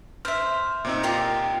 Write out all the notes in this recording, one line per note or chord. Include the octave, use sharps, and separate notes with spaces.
C5 E5 F6
A#2 C4 D#4
F4 G4 A#4